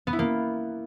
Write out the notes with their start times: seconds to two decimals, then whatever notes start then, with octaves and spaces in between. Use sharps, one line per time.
0.07 B3
0.13 E4
0.19 A#3